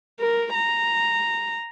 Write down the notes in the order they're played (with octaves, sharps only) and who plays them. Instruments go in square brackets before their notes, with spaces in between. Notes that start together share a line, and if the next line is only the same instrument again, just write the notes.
[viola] A#4
A#5